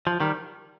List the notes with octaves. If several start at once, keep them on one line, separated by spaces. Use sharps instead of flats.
F3
D#3 G3